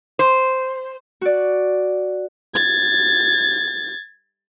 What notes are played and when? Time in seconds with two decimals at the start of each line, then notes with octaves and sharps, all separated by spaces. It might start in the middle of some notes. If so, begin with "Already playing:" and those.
0.19 C5
1.21 F#4 D5
2.55 G#6 A6